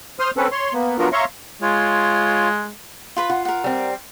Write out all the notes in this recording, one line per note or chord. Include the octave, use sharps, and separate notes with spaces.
C5 C6 D#6 F6
C4 C#4 A4 B4
C#5 C6
A#3 B3
F#3 B3 D4 F4 F#4 A#4
C#5 E5 F5 A#5 C6 C#6
G#3 F4 C#5
F4 B4 B5
F4 F#5
A#4 F#5
G3 C4